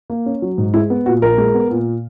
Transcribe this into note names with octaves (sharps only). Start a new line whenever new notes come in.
A#3
C#4
F#3
G#2
G#3 E4
B3
A#2 F#4
A#1 A#4
G#3
B3
A#2